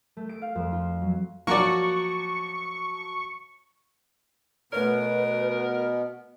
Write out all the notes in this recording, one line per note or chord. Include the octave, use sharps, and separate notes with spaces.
A3
D7
F5
F2
F4
F#3
F3 F#3 A#3 F#4 D5 C#6
B2 A3 B3 A#4 B4 C#5